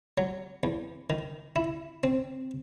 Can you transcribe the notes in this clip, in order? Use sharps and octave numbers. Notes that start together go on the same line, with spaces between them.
F#3
E2
D#3
E4
C4